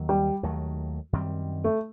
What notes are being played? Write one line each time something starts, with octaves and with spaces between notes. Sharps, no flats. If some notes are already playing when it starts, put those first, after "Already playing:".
Already playing: D#2 D#3 F#3 A#3
G3
D#2 D#3 F#3 A3
F#2 D#3 G3 C4
A3